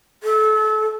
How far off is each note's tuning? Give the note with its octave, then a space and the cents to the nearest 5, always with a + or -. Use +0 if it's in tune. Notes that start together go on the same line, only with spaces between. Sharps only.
A4 -30